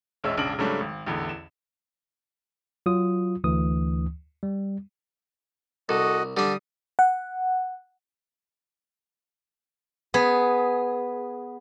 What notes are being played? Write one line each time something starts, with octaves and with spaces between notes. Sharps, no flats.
E1 A#1 G#3 C#4 E5 E6
E1 A#1 C#3 D4 D7 F#7
G#2 C#3 F#3 G3 A3 D4
G#1
A1 E2 D3
E7
F#3 F4 D#6
D2 E3 D#6
G3
C2 F#4 A4 D#5
D3 G3 D4 D#6
F#5
B3 G#4